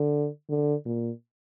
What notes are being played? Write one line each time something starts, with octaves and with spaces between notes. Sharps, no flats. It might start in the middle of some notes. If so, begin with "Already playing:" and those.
Already playing: D3
D3
A#2